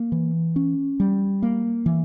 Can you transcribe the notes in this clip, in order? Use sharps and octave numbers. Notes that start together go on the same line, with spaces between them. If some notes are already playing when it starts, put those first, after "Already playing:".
Already playing: A#3
E3
C#4
G3
A#3
E3